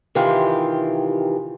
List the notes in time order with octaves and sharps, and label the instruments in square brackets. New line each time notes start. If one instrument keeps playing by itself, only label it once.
[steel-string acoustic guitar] C3 D#3 E3 F4 G4